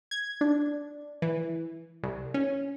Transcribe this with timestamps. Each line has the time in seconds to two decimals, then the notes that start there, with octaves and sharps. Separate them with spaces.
0.11 G#6
0.41 D4
1.22 E3
2.03 C2
2.34 C#4